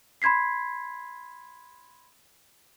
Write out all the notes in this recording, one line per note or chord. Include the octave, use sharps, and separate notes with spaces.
B5 C6 G#6 B6 C7